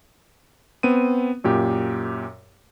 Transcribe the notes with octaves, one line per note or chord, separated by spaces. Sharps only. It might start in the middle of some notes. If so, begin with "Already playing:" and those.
B3 C4 D#7
F#2 A#2 G4